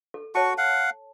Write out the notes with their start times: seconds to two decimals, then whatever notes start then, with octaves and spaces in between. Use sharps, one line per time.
0.14 A4
0.35 F#4 C#5 A5 C#6
0.58 F5 F#5